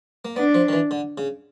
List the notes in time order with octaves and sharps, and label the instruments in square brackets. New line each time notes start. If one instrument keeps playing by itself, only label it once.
[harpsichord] A#3
[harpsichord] B3 [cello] D4
[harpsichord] F3
D#3
E3
D3
C#3